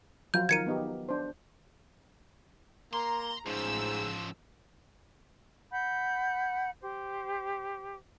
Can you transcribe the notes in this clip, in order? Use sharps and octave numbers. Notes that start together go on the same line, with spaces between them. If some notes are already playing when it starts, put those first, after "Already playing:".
F3 F#3 F4 G6
D#3 A#4 G#6 C#7 D#7
B3 D#4 G4
D4 C5
A#3 A#5 C6
A1 G#2 C#3 F3 E6
F#5 B5 G6
G4 C5